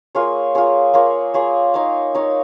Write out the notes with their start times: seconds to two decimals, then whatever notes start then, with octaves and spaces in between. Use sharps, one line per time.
0.15 A#3 F4 G#4 C#5
0.55 A#3 F4 G#4 C#5
0.94 A#3 F4 G#4 C#5
1.34 A#3 F4 G#4 C#5
1.74 D#4 C#5 F5
2.15 D#4 C#5 F5